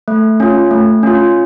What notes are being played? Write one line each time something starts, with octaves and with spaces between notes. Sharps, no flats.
A3
C#4 F4
A3
C#4 F4